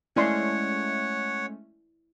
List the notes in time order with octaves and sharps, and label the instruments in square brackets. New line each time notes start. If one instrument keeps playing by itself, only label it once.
[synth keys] G#3 A3 C#4 [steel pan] E4 D5 C6 [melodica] C#5 F#5